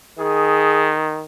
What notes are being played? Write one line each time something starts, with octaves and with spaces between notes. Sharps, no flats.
D#3 G#4